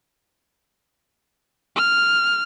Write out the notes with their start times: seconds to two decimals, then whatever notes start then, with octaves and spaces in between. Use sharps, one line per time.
1.76 F6